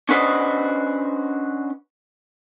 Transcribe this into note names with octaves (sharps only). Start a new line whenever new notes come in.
C#4 D4 F#4 B4 C5 D#5